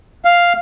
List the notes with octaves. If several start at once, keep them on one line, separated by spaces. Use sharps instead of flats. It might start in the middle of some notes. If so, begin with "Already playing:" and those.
F5